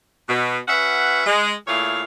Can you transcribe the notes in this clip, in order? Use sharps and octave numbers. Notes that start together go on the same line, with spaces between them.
B2
C#4 F#4 B4 E5 F#5
G#3
A#2 A3 E4 G#4 C#5 F5